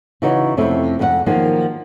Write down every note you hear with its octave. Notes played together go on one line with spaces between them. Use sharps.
C#3 E3 D#4 F#4 C#5
F2 C3 A3 C#4 E4
F2 F#4 F#5
D#3 F3 F#3 A#3 G#4